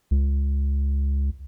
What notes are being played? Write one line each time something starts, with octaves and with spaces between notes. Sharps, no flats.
C#2